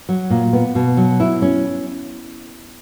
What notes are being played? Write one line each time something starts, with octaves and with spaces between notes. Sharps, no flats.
F#3
A#2
B3
B2
F#3
E4
C#4